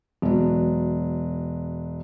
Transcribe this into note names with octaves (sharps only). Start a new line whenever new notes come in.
E1 F#3